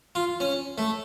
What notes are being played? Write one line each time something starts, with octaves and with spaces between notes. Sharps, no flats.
F4
C#4
A3